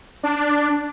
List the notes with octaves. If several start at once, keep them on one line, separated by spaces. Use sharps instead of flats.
D4